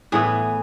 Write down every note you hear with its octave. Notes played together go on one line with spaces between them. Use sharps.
A2 E3 B3 E4 G#4